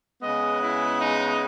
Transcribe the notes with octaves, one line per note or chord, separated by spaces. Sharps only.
C#3 G#3 B3 D#5
E4
D#4